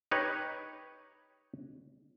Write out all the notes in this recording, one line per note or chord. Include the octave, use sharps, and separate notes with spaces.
D#4 G4 B4 C#5